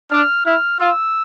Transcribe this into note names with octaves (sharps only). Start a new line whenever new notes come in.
D4 F6
E4 F6
F4 E6